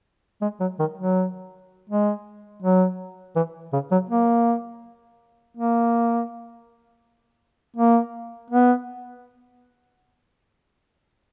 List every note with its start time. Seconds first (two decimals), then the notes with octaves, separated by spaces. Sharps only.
0.42 G#3
0.60 F#3
0.79 D#3
0.98 F#3
1.89 G#3
2.62 F#3
3.36 E3
3.73 C#3
3.91 F#3
4.09 A#3
5.57 A#3
7.76 A#3
8.50 B3